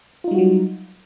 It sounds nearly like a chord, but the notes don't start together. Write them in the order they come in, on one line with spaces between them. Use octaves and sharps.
F4 D#4 G3 F#4 F#3